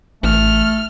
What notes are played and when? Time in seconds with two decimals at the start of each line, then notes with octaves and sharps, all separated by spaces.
0.23 A1 A3 F6